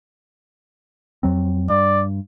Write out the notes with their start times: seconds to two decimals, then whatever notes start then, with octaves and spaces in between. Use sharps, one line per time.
1.23 F2 F#3 C4
1.70 G2 D5